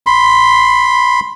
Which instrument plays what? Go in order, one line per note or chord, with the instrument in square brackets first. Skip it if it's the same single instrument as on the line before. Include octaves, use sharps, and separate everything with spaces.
[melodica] B5 C6